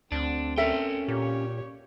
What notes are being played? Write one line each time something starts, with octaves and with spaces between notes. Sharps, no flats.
D2 C4 D4
C#4 A4 A#4 E5 G5
A#2 G4 C#5